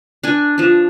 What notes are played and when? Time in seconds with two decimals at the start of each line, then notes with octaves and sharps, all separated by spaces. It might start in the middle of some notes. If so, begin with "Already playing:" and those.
0.23 D4 G#5
0.58 F3 D4